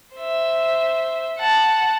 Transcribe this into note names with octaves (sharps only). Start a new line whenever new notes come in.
C5 E5
F#5 A5